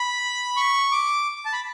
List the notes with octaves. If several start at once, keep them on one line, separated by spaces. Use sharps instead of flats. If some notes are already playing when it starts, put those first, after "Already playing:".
Already playing: B5
C#6
D6
A5
B5